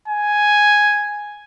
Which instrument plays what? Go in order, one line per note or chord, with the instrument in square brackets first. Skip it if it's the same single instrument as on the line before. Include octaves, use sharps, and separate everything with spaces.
[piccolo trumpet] G#5